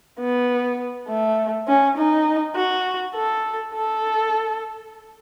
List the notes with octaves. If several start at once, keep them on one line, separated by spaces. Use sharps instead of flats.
B3
A3
C#4
D#4
F#4
A4
A4